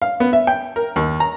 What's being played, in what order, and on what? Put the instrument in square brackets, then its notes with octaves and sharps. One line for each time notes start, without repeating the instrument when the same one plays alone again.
[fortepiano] F5
B3
E5
G5
A#4
D#2
A#5